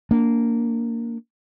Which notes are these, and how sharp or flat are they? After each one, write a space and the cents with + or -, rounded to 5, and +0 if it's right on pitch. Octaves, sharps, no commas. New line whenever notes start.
A#3 -10 D4 -25